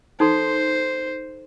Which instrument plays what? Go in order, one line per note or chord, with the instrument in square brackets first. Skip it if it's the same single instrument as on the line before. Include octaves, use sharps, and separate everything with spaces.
[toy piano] D#4 A4 C6 [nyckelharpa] C5